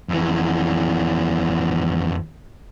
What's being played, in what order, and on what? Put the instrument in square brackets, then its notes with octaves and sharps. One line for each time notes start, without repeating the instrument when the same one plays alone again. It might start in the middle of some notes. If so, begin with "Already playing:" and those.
[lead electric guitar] F2 E3